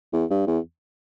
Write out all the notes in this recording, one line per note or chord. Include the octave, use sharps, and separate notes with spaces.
E2
G2
E2